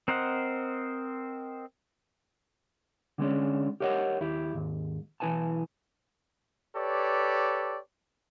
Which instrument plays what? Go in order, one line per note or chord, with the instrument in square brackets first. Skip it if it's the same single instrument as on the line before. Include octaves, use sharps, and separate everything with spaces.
[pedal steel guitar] C4 A#4 C5 D#5 F#5
[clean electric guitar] D3 G#3 A3 B3 C#4 D4
G4 A#4 C#5 D#5 F#5
D#2 E4 G4
D#2 G#2
B1 E3 E4 B4 G#5 A5
[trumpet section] G4 A4 B4 C#5 D5